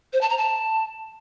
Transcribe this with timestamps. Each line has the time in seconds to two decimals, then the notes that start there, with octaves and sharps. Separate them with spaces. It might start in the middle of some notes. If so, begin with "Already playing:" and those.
0.13 C5
0.21 A5
0.29 A#5
0.38 A5